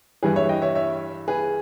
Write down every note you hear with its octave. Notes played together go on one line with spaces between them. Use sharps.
G2 E3 G3 G#4 B4
C#5 E5
D#5 G5
C#5 E5
C#5 E5
G#4 B4